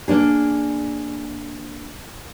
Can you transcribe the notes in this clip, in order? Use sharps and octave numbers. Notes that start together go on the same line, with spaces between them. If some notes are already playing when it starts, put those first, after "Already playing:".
A#3 D4 G#4